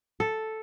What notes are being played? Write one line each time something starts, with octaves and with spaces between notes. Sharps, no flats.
A4